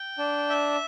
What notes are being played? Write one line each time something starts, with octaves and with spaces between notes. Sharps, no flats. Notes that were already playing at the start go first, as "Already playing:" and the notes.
Already playing: G5
D4
E5